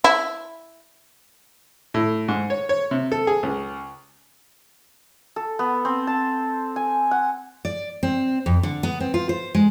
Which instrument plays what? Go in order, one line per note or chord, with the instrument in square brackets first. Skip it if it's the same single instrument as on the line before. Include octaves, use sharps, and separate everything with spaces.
[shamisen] E4
[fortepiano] A2
G#2
C#5
C#5
C3
A4
G#4
C#2
[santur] A4
B3
C4
A5
G#5
F#5
[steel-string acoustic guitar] D5
C4
F2
D3
B3
C4
F4
C5
G#3